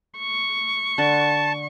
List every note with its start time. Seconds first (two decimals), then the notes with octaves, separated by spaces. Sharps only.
0.18 C#6
0.98 D3 A5